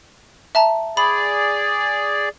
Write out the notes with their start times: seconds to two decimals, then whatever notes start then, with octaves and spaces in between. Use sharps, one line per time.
0.55 E5 A5 A#5
0.97 G#4 D5 B5